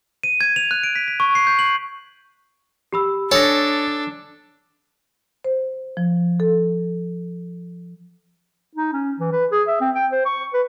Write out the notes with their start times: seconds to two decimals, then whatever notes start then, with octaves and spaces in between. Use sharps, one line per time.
0.23 D#7
0.41 G#6
0.56 F7
0.71 F#6
0.83 D7
0.95 B6
1.08 B6
1.20 C#6
1.35 C7
1.47 G6
1.59 F#7
2.93 G4 B5 E6
3.32 D4 A4 C#5 G#5 D#6 A#6
5.44 C5
5.97 F3
6.40 A4
8.75 D#4
8.93 C#4
9.20 E3
9.32 B4
9.52 G#4
9.68 E5
9.81 C4
9.95 G5
10.11 C5
10.25 C#6
10.54 B4